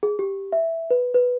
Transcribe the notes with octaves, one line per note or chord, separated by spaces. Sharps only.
G#4
G4
E5
B4
B4